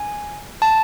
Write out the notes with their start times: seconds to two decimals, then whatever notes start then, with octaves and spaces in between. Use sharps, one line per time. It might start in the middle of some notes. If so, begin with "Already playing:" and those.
Already playing: G#5
0.62 A5